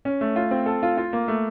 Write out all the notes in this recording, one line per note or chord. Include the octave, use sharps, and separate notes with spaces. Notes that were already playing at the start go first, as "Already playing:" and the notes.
C#4
A3
F4
C4
A4
F4
F4
A#3
A3